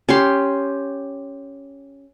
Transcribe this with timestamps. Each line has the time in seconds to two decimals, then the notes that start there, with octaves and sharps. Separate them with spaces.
0.09 C#4 G4 C6